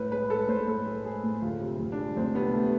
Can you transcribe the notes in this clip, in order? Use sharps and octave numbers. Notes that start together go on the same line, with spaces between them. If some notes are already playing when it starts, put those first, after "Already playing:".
Already playing: A2 B4
G#3 B4
G#3 A4
A2 C5
A2 A4
G#3
G#3 G#4
A2
D2 F4
C3
D2
D4
G#3
D2 C4
C3 B3
A3